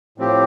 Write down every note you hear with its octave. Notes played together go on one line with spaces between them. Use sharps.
A2 F3 C4 G4